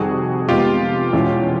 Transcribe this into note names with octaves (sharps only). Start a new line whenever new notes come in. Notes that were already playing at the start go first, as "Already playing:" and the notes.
Already playing: F2 C3 D#3 G3 C4 F#4 G#4
F2 C3 D#3 G#3 B3 F4 G4
E2 B2 G#3 C#4 E4